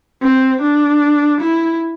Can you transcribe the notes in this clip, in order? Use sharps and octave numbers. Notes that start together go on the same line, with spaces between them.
C4
D4
E4